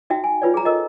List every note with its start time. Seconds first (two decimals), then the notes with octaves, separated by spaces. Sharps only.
0.10 D#4 F#4 E5 G5
0.24 G#5
0.42 F4 B4 C#5 D5
0.54 G#4 A#5
0.65 A4 A#4 D#5